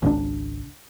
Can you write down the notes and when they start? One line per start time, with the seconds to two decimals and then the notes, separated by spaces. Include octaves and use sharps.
0.02 G#1 C#2 D#3 D4